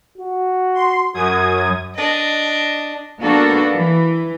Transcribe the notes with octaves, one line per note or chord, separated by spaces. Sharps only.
F#4
C6
F#2 F#4 D#6 G#6
D4 D#5
A#3 B3 D4 F#4 A4
E3